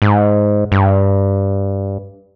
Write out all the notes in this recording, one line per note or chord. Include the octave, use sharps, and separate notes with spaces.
G#2
G2